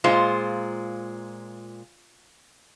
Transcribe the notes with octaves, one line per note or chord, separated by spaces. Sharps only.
A#2 G#3 F4 C5